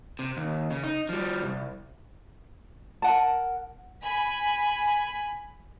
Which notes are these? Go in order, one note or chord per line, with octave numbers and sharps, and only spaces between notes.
C3
D#2
C#3
D#4
F3 G3
C2
A#4 F#5 A5
G#5 B5